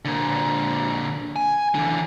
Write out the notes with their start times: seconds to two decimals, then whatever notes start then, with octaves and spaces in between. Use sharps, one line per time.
0.05 A#2 D3
1.36 G#5
1.75 D3 E3